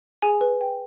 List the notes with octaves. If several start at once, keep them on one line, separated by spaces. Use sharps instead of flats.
G#4 G#5
B4
G5